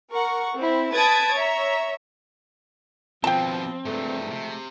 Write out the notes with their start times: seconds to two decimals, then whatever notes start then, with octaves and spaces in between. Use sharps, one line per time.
0.11 A#4 F#5 C#6
0.54 C4 E4
0.93 B4 A5 D#6 G#6 A6 D7
1.35 C#5 E5 A#5
3.24 D#2 B2 F3 C4 G5 A5
3.85 G2 C3 F3 G#3 A3
4.31 C3